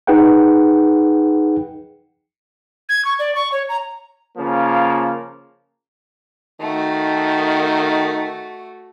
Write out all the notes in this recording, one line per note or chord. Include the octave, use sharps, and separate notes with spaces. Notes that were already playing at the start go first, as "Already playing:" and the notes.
D#4 G#4 B4 F#5 G5
G#6
C#6
D5
C#6
C#5
A#5
C#3 F3 A#3
D#3 A3 F#4